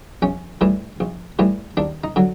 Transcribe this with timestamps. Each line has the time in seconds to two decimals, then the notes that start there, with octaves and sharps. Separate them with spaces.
0.22 A#1 C#4
0.61 A2 E3 G3
1.00 A#1
1.39 A2 E3 G3
1.77 D#2 D4
2.04 D#4
2.16 D3 F#3